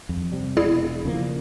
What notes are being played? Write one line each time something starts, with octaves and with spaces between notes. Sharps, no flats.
F2
C3 G3
E1 E4 G#4 D5
C#3 F3 A#3